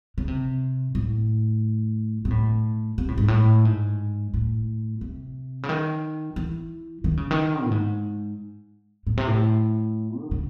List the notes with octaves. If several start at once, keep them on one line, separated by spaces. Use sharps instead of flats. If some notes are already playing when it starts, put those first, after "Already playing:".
C#3
C3
A2
C3
A2
C3
A2
G#2
A2
G#2
A2
C3
C#3
D#3
E3
D#3
C#3
D#3
A2
G#2
A2
C3
A2
D#3
C#3